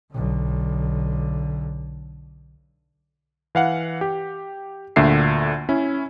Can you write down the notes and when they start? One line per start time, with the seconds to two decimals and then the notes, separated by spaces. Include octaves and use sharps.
0.12 B1 D3
3.55 E3 F5 F#5
4.01 G4
4.96 D2 A#2 D3 E5 C7
5.69 C#4 E4